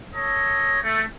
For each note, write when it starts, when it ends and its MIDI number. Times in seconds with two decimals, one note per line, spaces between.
0.14 0.78 69
0.14 0.78 73
0.14 0.78 75
0.83 1.03 57